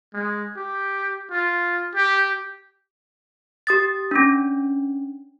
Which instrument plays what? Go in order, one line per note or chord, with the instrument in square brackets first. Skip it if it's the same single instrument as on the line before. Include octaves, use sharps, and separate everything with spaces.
[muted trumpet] G#3
G4
F4
G4
[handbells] G4 D#6 A6
C#4 D4